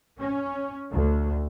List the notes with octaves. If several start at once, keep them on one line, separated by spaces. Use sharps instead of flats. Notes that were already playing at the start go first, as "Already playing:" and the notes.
C#4
D2